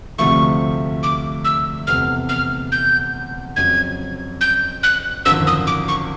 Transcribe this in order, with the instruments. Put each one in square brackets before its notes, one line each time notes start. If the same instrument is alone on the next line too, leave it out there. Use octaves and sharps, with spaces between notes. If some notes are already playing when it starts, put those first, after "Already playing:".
[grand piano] D2 C3 F3 A3 [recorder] C#6
[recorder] D6
E6
[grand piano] F1 E2 C3 [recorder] F6
[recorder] F6
G6
[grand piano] F2 C#3 F#3 [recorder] G#6
[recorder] G6
F#6
[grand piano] G#1 F#2 D3 F3 [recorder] E6
[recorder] D#6
D6
C#6